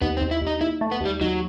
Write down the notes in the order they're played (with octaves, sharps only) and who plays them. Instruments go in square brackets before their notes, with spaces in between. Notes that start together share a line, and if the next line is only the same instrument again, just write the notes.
[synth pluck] D#2 [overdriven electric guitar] B3
[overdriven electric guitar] C4
[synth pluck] D#2
[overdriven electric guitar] E4
[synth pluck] D#2
[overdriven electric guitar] D#4
[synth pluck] D#2 [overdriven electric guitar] E4
[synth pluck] A3
[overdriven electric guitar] B3
[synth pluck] D#2 [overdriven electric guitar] G3
[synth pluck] D#2 [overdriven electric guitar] F#3